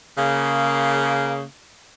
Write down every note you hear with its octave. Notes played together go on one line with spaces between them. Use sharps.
C#3 A#3